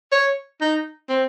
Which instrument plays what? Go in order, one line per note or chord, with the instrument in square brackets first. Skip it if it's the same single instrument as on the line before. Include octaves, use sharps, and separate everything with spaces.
[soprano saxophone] C#5
D#4
C4